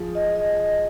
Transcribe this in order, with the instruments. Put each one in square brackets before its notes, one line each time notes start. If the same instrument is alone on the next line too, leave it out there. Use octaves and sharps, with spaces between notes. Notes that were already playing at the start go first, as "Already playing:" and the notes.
Already playing: [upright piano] F3 G#4
[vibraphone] D#5
D#5
D#5